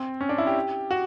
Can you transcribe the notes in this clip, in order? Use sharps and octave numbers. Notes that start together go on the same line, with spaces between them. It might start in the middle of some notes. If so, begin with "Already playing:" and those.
Already playing: C4
C#4
D4
E4
G4
F#4